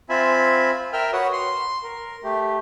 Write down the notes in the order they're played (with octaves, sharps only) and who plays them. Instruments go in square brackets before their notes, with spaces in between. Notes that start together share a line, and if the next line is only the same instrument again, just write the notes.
[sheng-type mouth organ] C4 F4 E5 G#5 B5
A#4 E5 G5 F6
F#4 B4 C#5 F#5 D#6
C6
A#4
A3 G4